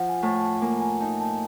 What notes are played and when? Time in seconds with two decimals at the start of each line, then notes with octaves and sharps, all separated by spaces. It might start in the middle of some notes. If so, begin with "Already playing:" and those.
Already playing: F3 F#5
0.09 G#5
0.23 A2
0.35 A5
0.62 A#3 G#5
0.81 G#5
1.00 D#4 A5
1.21 A5